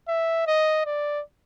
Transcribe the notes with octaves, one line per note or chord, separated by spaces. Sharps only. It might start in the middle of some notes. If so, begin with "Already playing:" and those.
E5
D#5
D5